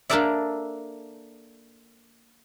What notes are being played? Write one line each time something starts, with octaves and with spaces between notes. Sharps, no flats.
A#3 D4 A4 A#4 D5 E5